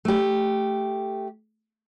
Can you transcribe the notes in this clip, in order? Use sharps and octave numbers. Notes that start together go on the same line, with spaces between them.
A3 G4